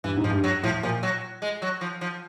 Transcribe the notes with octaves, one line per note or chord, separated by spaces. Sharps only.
G2 E3
G#2
F3
G2
F#3
A2 F3
A#2 F3
F#3
G#3
F#3
F3
F3